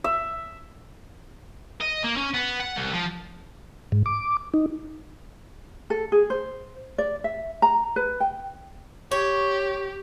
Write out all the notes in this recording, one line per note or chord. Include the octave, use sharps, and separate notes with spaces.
E5
D#5
A#3
C#4
B3
F#5
C2
F3
G#2
D6
D#4
A4
G#4
C5
D5
E5
A#5
B4
G5
G4 C#5